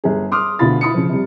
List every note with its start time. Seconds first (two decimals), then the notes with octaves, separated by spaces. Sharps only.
0.04 G1 G#4
0.32 C6 D6 D#6 F6
0.59 D2 B2 D3 F4 B5 A6
0.81 E4 B5 D#6 C#7
0.94 C#3 F3
1.09 C3 G3